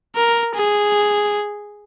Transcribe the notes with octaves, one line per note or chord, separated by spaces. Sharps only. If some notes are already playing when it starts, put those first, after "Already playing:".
A#4
G#4